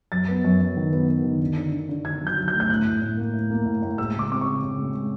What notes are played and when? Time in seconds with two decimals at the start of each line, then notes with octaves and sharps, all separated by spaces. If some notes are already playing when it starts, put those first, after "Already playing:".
0.12 F#2 A6
0.29 B3
0.44 F#2
0.61 F#2
0.77 D#3
0.92 B3
1.09 B3
1.24 D#3
1.41 D3
1.57 D3
1.73 D3
1.89 D3
2.05 D3 G#6
2.22 F#3 G6
2.38 F#3
2.48 G6
2.53 A3
2.60 G6
2.69 A2 F#6
2.86 A2
3.01 A2
3.17 A#3
3.33 A2
3.50 A#3
3.65 A2
3.82 A2
3.98 G#3 E6
4.14 C#3
4.19 D6
4.31 C4 D6
4.41 C#3 C#6
4.63 C#3
4.79 G#3
4.94 G#3